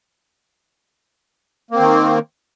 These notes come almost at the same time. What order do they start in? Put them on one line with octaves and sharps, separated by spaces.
A#3 C4 D#3